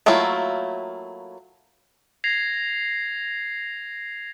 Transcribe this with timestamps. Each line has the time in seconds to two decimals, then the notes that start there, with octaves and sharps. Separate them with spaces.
0.06 F#3 A3 A#3 E4 F4
2.24 G#6 A#6 C7 F7